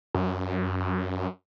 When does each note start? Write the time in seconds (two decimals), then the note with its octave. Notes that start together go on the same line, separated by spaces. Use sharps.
0.15 F#2